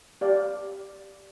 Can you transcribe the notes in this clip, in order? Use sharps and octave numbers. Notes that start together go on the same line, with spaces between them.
G4 D5 F5